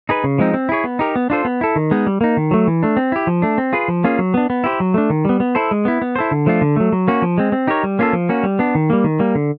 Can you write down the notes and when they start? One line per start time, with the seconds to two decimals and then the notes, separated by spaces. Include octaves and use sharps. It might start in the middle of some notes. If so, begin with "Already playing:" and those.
0.09 D#4 G#4 B4
0.24 C#3
0.38 F3 G#3 C4 D#4
0.54 C4
0.69 E4 G#4 C#5
0.84 B3
0.99 D#4 G4 A#4
1.16 B3
1.30 D4 F4 A4 C5
1.45 B3
1.61 E4 A4
1.76 D#3
1.91 G#3 B3 D#4
2.07 G3
2.21 A#3 D#4
2.37 D#3
2.51 F#3 A3
2.67 E3
2.83 A3 D4
2.97 C4
3.12 E4 G4
3.27 F3
3.42 A3 D4
3.58 C4
3.73 F4 G#4 B4
3.88 F3
4.04 A#3 C#4 F4 G#4
4.19 F#3
4.34 B3 D4
4.50 B3
4.64 E4 G4 C5
4.80 F#3
4.94 A3 D4
5.10 D#3
5.25 G3 B3
5.40 B3
5.55 E4 A4 C5
5.71 G#3
5.85 B3 E4
6.02 B3
6.16 E4 A4 C5
6.31 D3
6.46 F3 A3 D4 F4
6.61 D3
6.76 F#3 A3
6.92 F#3
7.08 A#3 C#4 F#4
7.22 F3
7.38 G#3 C4
7.52 C4
7.67 D#4 G4 A#4 C#5
7.83 G3
7.99 A#3 C#4 F4 A4
8.13 F3
8.29 A#3 C#4 F#4
8.43 G3
8.59 B3 D4
8.75 D#3
8.90 G3 A#3
9.04 D#3
9.19 G3 A#3
9.35 D3